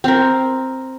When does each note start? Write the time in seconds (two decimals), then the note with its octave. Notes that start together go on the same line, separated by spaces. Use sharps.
0.04 C4 A#4